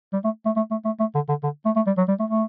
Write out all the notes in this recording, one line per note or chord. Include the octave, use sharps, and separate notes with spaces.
G3
A3
A3
A3
A3
A3
A3
D3
D3
D3
A3
A3
G3
F#3
G3
A3
A3